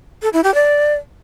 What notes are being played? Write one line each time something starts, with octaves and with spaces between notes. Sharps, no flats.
A4
E4
G4
D5